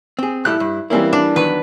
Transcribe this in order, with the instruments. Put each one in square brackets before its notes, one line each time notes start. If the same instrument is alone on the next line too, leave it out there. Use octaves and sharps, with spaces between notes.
[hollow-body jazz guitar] C4 G#4
[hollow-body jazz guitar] A2 G3 A4 [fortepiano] E4 F#6
[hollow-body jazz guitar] G2
[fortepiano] E3 G3 A#3 [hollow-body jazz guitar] C4 C#4 E4
[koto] D4
[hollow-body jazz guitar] E2 D#3 F#3 [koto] B4